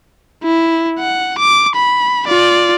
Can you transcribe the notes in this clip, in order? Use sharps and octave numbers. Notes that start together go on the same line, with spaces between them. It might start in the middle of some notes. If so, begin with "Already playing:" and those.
E4
F#5
D6
B5
F4 D5